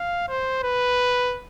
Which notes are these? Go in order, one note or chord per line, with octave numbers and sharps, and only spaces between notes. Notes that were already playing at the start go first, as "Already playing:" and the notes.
Already playing: F5
C5
B4